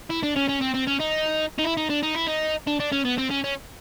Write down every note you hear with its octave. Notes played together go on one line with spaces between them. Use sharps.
E4
D4
C#4
C#4
C4
C4
C#4
D#4
D#4
E4
D#4
D4
D#4
E4
D#4
D4
D4
C#4
B3
C4
C#4
C#4